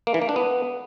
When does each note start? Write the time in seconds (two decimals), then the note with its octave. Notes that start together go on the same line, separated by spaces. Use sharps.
0.07 A#3
0.14 E3
0.22 A#3
0.29 D4
0.36 B3